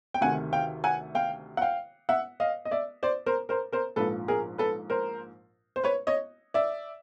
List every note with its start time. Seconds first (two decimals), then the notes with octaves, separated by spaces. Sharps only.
0.14 G5
0.21 D2 C3 D#3 F#5 G#5
0.53 F5 G5
0.84 F#5 G#5
1.15 F5 G5
1.57 F#5
1.62 F5 G5
2.09 E5 F#5
2.40 D#5 F5
2.65 D#5
2.71 D5 E5
3.03 C5 D5
3.26 A#4 C5
3.49 A#4 C5
3.73 A#4 C5
3.96 A#1 G#2 F3 A4 B4
4.28 G#4 A#4
4.58 A4 B4
4.90 A#4 C5
5.76 C5
5.84 B4 C#5
6.07 C#5 D#5
6.54 D5 E5